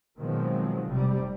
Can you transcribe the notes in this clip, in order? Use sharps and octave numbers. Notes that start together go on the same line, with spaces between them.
B2 D#3 F3 F#3 G#3 C4
F1 C3 G3